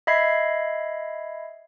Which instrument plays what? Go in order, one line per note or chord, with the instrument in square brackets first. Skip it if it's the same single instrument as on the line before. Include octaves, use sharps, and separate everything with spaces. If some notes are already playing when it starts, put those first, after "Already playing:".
[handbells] D#5 E5 B5 G#6 C7